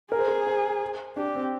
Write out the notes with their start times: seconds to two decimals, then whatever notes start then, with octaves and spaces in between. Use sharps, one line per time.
0.11 G#4 A#4
0.19 C5
0.28 A#4
0.47 C5
1.16 D4 G4
1.35 C4